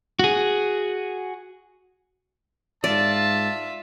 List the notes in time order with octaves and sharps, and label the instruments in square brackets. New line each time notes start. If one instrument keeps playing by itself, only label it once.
[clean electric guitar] F#4 G#4
[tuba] G#2 [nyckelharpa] F4 E5 [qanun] D5 [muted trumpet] A5